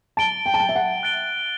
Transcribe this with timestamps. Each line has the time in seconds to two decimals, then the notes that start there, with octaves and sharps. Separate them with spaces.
0.17 A5 A6 D7 G7
0.46 G5
0.54 A5
0.60 G5
0.69 E5
0.76 F#5
1.03 F#6 A6 D7 G7